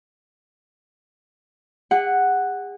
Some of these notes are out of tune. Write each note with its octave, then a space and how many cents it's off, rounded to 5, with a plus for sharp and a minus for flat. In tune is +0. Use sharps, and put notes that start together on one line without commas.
G#4 -40 F#5 +0